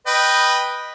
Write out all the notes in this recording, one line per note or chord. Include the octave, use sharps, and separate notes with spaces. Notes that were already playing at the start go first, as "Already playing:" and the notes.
B4 D#5 G5